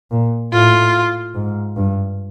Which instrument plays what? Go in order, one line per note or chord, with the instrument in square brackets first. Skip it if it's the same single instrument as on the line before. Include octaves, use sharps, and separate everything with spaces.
[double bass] A#2
[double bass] A2 [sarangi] F4
[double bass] G#2
G2